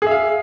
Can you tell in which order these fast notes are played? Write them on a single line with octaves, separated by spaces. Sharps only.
G#4 E5 F5